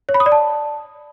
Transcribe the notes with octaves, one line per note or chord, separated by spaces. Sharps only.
C#5
B5
D#6
D5
A5